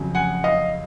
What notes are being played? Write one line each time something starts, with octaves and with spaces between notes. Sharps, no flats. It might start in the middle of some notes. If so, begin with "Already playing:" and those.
Already playing: F2 C#3 F#3
F#5 G#5
D#5 F5